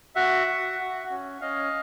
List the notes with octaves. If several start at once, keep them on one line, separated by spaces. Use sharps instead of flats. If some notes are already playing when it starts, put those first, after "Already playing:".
F#4 E5 F#5
F#4
F#4
C#4
C#4 D#5 F5